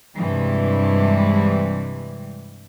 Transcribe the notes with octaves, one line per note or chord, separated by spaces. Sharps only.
G2 C3 E3 G3 G#3